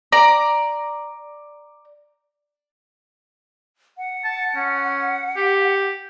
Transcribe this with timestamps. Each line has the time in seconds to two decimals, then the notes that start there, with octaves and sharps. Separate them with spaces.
0.12 D5 A#5
3.98 F#5
4.24 A5
4.56 C#4
5.36 G4